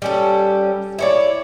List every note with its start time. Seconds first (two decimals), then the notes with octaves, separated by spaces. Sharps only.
0.02 G3 C#4 A4
0.99 E4 C#5 D5